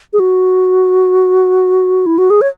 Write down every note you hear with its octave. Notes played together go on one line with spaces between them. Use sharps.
G#4
F#4
E4
F#4
G#4
C#5